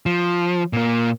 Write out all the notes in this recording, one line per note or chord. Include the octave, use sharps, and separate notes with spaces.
F3
A#2 A#3